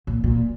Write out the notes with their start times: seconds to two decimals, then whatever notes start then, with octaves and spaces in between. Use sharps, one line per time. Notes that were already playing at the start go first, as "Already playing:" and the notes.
0.07 A#2
0.24 A#2